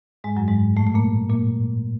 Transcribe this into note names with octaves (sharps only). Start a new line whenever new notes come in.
G#2 G#3
F#2 F#3
G#2 G#3
A2 A3
A3
A#2 A#3
A#2 A#3